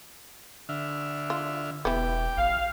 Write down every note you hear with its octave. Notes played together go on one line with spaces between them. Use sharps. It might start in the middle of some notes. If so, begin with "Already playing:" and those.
D3 E5 F6
F4
E1 E3 B3 G4 G5 D6
A1 F5